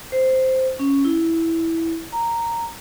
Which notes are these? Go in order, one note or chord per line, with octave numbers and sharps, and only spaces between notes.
C5
C#4
E4
A#5